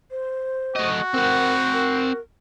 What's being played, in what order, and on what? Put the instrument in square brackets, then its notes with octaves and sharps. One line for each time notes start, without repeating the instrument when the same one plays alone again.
[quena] C5
[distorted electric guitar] A3 D#5 [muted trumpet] F#4
[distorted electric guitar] C4 F#5 [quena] A#4
[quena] A#4